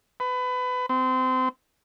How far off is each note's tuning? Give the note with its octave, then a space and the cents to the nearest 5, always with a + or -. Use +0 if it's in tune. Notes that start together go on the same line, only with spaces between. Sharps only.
B4 +25
C4 -25